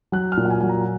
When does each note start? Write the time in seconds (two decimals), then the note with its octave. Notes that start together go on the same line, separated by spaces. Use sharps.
0.12 F#3 F#6
0.32 F6
0.37 A#2
0.45 F#5
0.50 G#5
0.61 F#3 G#5
0.69 A#5